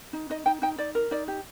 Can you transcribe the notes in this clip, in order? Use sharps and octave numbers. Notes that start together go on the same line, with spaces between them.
D#4
D#4 D#5
D#4 G5
D#4 G5
D#4 D5
A#4
D#4 D5
G4